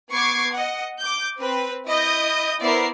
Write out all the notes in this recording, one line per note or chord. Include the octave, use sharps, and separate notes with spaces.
B3 C#6 D6 G#6 C7
D#5 F#5
D6 G6
C4 B4
E4 D#5 D#6 G6
B3 E4 A#4 C5 D5 C7